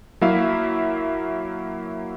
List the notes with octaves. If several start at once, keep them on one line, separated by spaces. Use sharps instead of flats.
F#3 A#3 E4 E5 F5